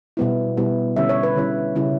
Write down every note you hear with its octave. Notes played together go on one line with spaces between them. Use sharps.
B2 G3 B3 E4
B2 G3 B3 E4
D3 G3 C#4 E4 E5
C#5
B4
D3 G3 C#4 E4
C#3 G3 C#4 E4